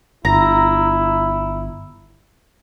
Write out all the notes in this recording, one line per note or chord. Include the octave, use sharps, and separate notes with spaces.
G1 E4 A#5